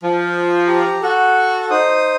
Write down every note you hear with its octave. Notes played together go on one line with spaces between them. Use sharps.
F3
G4 A#5
F#4 A4
D#4 C5 D#6